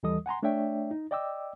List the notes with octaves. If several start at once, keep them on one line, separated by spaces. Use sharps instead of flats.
D#2 E3 G3 A4 D#5 D#6
F#5 G#5 A#5 C6
A3 D4 C#5 D5 E5 G5
D#4
D5 D#5 G5 D6 E6